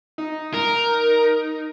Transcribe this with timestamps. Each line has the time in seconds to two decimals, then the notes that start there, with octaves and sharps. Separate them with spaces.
0.18 D#4
0.54 A#4